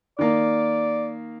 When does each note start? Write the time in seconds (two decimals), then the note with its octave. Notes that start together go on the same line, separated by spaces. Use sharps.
0.19 D#3 A#3 D5